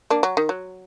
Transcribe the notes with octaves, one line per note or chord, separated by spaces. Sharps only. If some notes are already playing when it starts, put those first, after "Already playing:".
A#3 D4
F#3
D#3
F#3